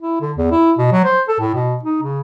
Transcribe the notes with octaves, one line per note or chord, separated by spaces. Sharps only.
E4
D3
E2
E4
B2
F#3
C5
A4
A2
B2
D#4
C#3